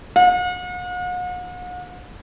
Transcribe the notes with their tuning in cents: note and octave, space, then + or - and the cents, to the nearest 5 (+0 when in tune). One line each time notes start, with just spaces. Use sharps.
F#5 -45